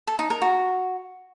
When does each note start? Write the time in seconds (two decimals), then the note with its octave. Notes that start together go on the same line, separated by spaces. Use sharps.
0.07 A4
0.19 D#4
0.30 A#4
0.42 F#4